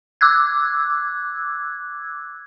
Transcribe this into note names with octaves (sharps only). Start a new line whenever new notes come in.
D6 E6 F#6 G#6